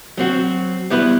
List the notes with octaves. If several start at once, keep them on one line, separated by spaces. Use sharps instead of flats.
F#3 C4 F#4
G3 B3 E4 B4